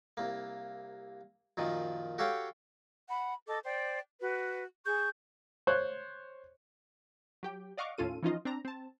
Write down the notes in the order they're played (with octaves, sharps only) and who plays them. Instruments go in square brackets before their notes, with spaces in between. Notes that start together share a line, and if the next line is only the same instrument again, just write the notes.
[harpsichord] C2 A#3
F#2 A#2 D#3 F3
F#4 G4 A4 C#5 F5 G5
[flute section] F#5 B5
A4 D#5 D6
C5 D5 G5
F#4 B4
G#4 C#6 G6
[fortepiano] C5 C#5 F#6
[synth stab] F#3 G4 G5
D5 D#5 F5 F#5 C#6 D6
D#2 A2 C#4 F4 A4 D#7
E3 F3 C#4 D#4 F4 D#5
C4 D4 A#5
C4 A5